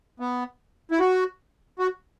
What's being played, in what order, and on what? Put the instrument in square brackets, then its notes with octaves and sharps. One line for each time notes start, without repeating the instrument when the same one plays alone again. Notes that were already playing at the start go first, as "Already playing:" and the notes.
[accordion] B3
E4
F#4
F#4